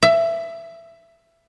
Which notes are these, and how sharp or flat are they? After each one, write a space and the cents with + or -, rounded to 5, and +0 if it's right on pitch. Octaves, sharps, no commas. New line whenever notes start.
E5 +20